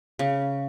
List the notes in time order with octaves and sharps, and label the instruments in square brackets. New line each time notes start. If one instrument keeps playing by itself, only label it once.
[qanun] C#3